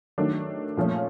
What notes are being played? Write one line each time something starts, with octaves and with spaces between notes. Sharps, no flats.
D#3 F#3 A3 D4
A#2 F3 A3 C#4